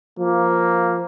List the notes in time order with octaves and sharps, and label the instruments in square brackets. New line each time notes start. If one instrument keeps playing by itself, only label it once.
[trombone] F3 [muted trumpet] A#3